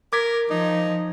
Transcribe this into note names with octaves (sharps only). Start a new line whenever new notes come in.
A#4 D6 G#6 B6
F3 D#4